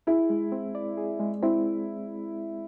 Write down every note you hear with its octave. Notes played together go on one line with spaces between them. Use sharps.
E4 G#4
G#3
C4
D5
G#4
G#3
C4 E4